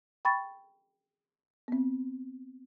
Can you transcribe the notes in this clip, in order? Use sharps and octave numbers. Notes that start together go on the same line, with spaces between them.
G5 B5 C#6 A6
B3 C4